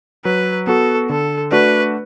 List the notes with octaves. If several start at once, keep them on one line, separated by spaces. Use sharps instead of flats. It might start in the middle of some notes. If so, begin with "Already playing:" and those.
F#3 B4
B3 F#4 A4
D3 A4
A3 D4 F#4 B4 D5